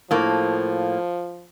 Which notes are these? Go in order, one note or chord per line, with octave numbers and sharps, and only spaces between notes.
A2 F3 A#3